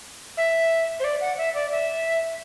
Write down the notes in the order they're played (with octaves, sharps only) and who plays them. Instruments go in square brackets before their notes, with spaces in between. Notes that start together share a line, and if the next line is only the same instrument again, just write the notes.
[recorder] E5
C5
D5
F#5
E5
D5
E5